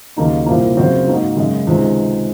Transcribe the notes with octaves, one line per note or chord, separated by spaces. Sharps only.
D#2 C#3 F#3 A#3 D#4
C2 A#2 F3 A#3
F#2 C#3 F#3 C4 F#4
G#2 F#3 A#3 D#4 F#4
F#2 C#3 G#3
C#2 C3 D#3 G#3